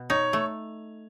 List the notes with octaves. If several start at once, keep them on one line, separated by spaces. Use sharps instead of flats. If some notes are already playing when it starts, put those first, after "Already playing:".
Already playing: B2
D#4 C#5
A3